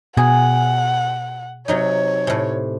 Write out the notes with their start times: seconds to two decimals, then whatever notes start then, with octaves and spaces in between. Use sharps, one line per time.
0.17 B2 G#4 F#5
1.68 C3 F#3 D#4 C#5
2.27 A2 C3